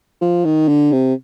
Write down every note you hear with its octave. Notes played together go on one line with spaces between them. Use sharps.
F3
D#3
D3
C3